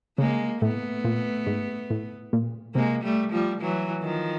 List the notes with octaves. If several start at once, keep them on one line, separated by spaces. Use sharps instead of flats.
C#3 G#3 A#3
A2 A3 B3
A#2
G#2
A2
A#2
C3 G#3 A#3
G3 A3
F3 G3
E3 F#3
D#3 F3